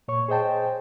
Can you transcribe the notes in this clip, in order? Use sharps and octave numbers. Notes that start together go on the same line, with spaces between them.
A#2 C#5 C#6
G#4 C5 D#5 G5 A5